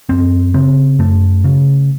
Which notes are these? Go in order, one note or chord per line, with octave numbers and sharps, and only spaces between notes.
F#2 C4
C#3 C4
F#2 A3
C#3